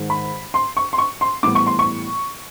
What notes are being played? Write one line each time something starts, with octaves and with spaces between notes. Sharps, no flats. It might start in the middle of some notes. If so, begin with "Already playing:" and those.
Already playing: G#2 D#3 G#3
B5
C6
C#6
C6
C#6
C6
A2 E3 G3 B3 D6
C#6
C6
C#6